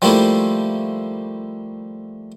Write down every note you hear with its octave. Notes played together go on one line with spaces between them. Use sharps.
F3 G3 A3 A#3 E4